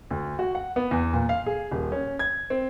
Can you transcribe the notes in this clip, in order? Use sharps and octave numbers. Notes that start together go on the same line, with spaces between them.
D2
F#4
F#5
B3
E2
A#2
F5
G#4
D#1
C#4
G#6
C4